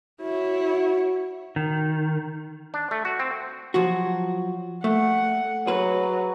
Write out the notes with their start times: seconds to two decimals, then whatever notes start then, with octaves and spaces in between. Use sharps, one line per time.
0.21 E4 F#4 C#5
1.56 D#3
2.74 D4
2.91 A3
3.05 F#4
3.19 C4
3.74 F3 F#3 F#4
4.84 A3 F#5
5.67 F#3 G#4 B4